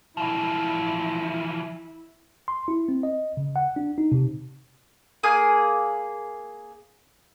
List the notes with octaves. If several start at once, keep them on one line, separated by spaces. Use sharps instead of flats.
E3 F3 E4
C6
E4
C4
D#5
C#3
F#5
D4
D#4
C3
A#3 G#4 G#5